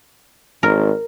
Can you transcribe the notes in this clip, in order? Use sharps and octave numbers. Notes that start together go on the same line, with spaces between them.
G#1 A#4